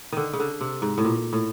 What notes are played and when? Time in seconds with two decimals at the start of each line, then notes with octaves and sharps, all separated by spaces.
0.12 D3 D#3
0.33 C#3
0.40 D3
0.61 C3
0.82 G#2
0.98 A2
1.04 A#2
1.33 A2